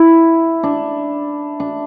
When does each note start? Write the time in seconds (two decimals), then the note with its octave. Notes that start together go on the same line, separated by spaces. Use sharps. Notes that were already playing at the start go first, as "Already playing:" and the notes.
Already playing: E4
0.63 D4
1.60 D4